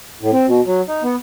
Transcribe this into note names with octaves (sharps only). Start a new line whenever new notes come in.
A2
C4
B2
F#3
D#4
B3